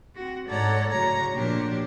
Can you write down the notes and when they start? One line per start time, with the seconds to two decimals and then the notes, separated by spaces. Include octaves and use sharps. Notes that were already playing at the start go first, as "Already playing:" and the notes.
0.15 C4 F#4
0.47 G#2 A4 C#5 D5 F#5 A#5
0.90 A2 C#3 F#3 C#5 A#5
1.33 A#2 F3 D4 G4 C#5